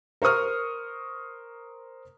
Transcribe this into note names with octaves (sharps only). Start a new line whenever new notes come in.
A#4 C5 C#6 D#6 F6